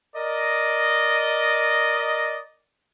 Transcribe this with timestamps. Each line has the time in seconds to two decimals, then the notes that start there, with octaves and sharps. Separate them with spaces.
0.16 A#4 D5 D#5